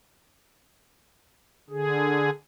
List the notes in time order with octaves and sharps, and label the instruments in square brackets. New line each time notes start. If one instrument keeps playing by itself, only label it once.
[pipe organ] D3 G#4